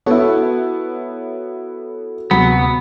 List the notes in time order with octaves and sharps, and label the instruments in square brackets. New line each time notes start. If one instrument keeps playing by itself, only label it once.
[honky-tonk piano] B3 E4 [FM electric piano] F#4 A4 C#5
[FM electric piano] D2 C3 [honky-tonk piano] F#3 [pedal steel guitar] B3